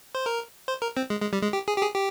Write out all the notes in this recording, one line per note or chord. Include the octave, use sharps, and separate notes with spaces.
C5
A#4
C5
A#4
C4
G#3
G#3
G3
G#3
G4
G#4
G4
G#4
G4